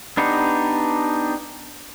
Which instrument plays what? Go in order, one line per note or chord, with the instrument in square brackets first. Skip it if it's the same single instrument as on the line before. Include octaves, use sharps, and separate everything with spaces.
[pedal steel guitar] B3 D4 D#4 G4